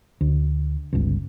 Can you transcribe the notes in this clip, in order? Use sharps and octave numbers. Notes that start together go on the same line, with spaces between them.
D2
G1 C#2